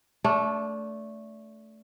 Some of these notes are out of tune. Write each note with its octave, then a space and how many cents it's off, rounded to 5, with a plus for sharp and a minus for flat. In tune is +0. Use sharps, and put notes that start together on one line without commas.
A3 +0 D4 -25